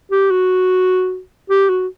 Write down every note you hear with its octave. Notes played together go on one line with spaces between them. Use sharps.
G4
F#4
G4
F#4